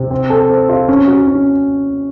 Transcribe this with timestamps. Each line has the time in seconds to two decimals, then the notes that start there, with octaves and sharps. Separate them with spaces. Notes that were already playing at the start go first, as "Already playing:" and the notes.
Already playing: C3
0.11 C4
0.30 A4
0.49 C4
0.69 F4
0.88 C#4
1.07 F#4
1.27 C#4